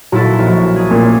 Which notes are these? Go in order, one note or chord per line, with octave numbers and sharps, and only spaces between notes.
A#2 F#3 E4 A4
A#1
G#4
A#2